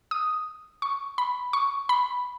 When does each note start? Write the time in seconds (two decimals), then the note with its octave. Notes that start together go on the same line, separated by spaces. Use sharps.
0.11 D#6
0.82 C#6
1.18 B5
1.53 C#6
1.89 B5